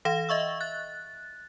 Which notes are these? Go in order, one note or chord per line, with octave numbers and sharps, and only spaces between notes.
E3 F5 A#6 E7
D#5 E5 C#6 E6
F#6 A6